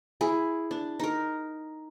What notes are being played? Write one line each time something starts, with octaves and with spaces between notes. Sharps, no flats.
E4 G#4
D4
D#4 A#4